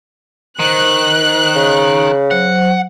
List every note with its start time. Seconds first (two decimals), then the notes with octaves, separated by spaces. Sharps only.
0.59 D#3 C5 F#6
1.56 C#3
2.31 F#3 C5 F#5